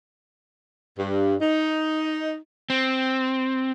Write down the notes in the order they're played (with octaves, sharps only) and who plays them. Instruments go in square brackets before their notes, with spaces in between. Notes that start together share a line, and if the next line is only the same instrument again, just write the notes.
[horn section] G2
D#4
[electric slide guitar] C4